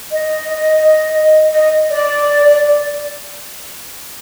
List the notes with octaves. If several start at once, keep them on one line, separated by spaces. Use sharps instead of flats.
D#5
D#5
D5
D5